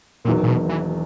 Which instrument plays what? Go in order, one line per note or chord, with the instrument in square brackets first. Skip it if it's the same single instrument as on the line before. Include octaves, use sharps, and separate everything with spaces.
[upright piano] E1 E2 D#3 F#3 A#3 [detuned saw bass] A#2
[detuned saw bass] A#2
B2
E3